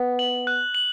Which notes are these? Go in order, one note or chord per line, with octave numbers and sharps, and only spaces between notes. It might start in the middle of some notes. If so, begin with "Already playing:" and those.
Already playing: B3
F#7
F#6
F#7